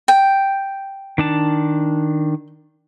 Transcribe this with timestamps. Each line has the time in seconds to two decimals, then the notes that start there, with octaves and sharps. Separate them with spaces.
0.08 G5
1.18 D#3 D4 A5